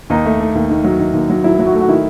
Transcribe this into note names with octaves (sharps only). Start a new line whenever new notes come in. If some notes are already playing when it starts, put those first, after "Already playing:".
D#2 D#4
A3
A3
D#2
D#3
F#3
D#3
D#2
F#3
F#3 E4
F#3
F#4
A3
F#4
D#3 E4